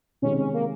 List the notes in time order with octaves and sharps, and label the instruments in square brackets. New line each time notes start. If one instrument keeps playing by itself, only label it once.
[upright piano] C3 D#3 G#3 D#4 G4 [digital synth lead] C#4
[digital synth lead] C#4
A#3